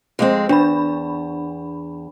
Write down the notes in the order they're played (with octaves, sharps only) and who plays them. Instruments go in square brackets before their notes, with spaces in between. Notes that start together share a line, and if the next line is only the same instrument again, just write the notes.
[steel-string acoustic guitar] F2 G#3 C4
[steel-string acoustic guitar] E2 [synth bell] D4 B5